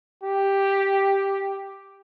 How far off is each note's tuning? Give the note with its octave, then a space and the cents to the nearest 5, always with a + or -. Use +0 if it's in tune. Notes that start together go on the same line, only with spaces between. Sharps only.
G4 +0